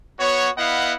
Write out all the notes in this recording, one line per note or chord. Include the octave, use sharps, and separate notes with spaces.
B3 F#4 C#5
B3 E4 D#5 F5 F#5